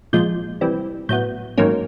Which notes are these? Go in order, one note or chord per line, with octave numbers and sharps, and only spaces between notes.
A#2 F3 G#3 G6
C3 E3 G3 C4
A2 F#3 B3 G6
G#2 D#3 F#3 A#3 C#4